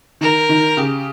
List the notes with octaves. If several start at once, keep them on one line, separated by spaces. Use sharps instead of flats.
D#3 A#4
D#3
C#3 G4